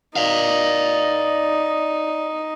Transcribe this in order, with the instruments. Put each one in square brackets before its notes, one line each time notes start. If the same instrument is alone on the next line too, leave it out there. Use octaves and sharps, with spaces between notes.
[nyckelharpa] D#4 [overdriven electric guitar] D5 F5